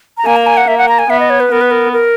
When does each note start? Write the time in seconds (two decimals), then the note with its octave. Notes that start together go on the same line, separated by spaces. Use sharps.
0.17 A#5
0.25 A#3 G#5
0.36 A#5
0.47 G#5
0.57 F#5
0.67 A#3 E5
0.78 F#5
0.89 A#5
0.99 G#5
1.09 B3 E5
1.20 D#5
1.30 C#5
1.40 B4
1.52 B3 A#4
1.61 B4
1.71 A#4
1.93 A#4